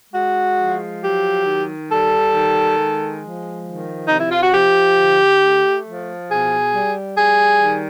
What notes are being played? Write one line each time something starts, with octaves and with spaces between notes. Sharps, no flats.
G#3 F#4
F3
F#3 G4
D#3
G3 A4
D#3
G#3
F3
D#3
C3 D#4
E4
F4
F#4
F3 G4
D3
A3
F3
B2 G#4
G3
G3 G#4
D#3